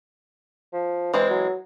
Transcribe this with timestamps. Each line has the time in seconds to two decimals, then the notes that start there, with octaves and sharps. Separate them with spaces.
0.73 F3
1.14 E3 G#3 C4 C5
1.30 F#3